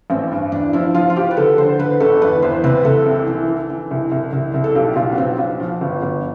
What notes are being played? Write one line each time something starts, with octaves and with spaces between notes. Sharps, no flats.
A1 C4
G2
E2 D4
F3 E4
F3 F4
F4
F3 G4
B4
D3 A4
D3 C5
D3 B4
G1 A4
E2 B4
E2 C5
C3 B4
C3 A4
C2
E3
E3
E3
C2
C2
C2
C2
A4
B1 G4
B1 F4
B3
B1 C4
B1
F3
G1
G1